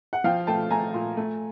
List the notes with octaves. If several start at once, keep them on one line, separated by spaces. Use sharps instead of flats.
F#5
F3 F5 G5
A3 G5 A5
A3 G#5 A#5
A#2
A3